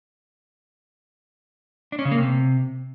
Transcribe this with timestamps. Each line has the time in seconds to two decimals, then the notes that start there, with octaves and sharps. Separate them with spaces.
1.92 D4
1.99 C#4
2.05 C#3
2.12 A#3
2.18 C3